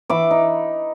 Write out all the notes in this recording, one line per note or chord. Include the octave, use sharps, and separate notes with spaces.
E3 B5 D6
D#4